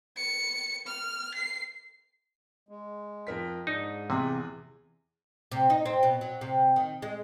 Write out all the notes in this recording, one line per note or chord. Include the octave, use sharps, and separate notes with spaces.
C#7
F6
C7
G#3
F2 A#4 B6
G#2 D4 D#4
E2 C3 G#4
C3
D#4
C4
B2
F#3
C3
D#3
G#3